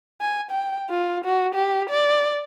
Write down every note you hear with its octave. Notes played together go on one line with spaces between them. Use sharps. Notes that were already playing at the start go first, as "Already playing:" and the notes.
G#5
G5
F4
F#4
G4
D5